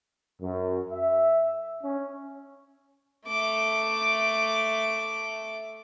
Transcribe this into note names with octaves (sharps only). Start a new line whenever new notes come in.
F#2
E5
C#4
A3 D6